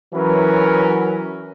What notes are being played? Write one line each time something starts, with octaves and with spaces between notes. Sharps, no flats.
E3 F#3 C#4 A#4 B4